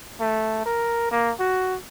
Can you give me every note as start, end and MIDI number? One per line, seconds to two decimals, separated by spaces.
0.20 0.65 57
0.66 1.08 70
1.11 1.31 58
1.39 1.77 66